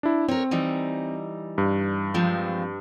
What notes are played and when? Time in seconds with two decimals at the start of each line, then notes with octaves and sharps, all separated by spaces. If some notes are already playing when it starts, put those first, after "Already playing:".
0.03 D4 E4
0.28 C4 A#4 C#5
0.51 E3 G3 D#4
1.58 G2
2.14 F3 G#3 C4